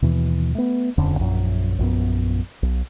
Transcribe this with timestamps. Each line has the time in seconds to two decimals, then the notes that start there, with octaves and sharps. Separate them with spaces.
0.02 D#2 B2 E3
0.55 A3 B3
0.98 D#1 F2 D3 C#4
1.19 A#1 F#2
1.78 A#1 F#2 B3
2.63 B1